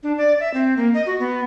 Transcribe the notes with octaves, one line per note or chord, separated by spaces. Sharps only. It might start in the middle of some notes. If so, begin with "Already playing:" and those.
D4
D5
E5
C4
A#3
D#5
F#4
B3